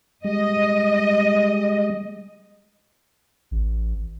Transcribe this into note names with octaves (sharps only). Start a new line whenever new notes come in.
G3 G#3 D#5
A1